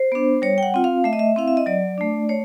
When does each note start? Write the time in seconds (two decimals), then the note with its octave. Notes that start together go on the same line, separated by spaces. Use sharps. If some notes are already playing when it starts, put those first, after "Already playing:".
Already playing: C5
0.12 B3 D4
0.42 G3 C#5
0.58 G5
0.63 F#5
0.74 C4 F4
0.84 F5
1.04 A3 E5
1.13 D#5
1.19 E5
1.36 C4 E4 F5
1.48 E5
1.57 D#5
1.66 F#3 D5
1.98 A3 D4
2.29 A3 C#5